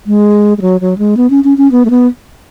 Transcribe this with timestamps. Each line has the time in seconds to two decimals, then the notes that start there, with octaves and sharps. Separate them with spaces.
0.07 G#3
0.58 G#3
0.61 F#3
0.81 F#3
0.98 G#3
1.17 B3
1.30 C#4
1.44 C#4
1.58 C#4
1.72 B3
1.85 A3
1.90 B3